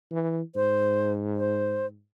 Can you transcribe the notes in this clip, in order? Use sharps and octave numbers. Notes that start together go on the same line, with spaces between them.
E3
G#2 C5
C5